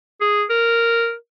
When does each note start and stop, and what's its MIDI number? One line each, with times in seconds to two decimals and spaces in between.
0.21 0.44 68
0.50 1.14 70